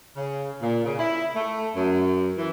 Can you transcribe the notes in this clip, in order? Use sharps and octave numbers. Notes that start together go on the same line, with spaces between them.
C#3
A#2
C#3
E4
A3
F#2
E3